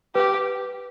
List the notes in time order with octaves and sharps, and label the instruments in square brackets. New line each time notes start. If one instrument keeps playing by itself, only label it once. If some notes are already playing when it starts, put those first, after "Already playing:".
[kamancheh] G4 [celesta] B4